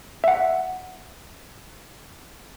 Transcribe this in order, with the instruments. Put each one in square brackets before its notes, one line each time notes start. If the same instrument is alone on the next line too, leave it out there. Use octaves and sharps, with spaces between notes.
[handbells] E5 F#5